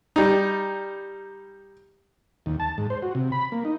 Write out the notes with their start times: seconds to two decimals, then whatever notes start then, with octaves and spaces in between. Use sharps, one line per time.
0.16 G3 D#4
2.46 D#2
2.60 A5
2.78 G#2
2.90 C5
3.02 F#4
3.15 C3
3.32 B5
3.52 A#3
3.65 D#4